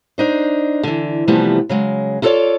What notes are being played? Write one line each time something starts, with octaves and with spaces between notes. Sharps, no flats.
D4 D#4 C5
D3 E3
C3 E3 F3 G3 A3 B3
C#3 F#3 G#3
E4 F4 A4 B4 C#5 D5